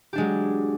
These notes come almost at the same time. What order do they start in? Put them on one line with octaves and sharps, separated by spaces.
G4 D4 G#3 F#3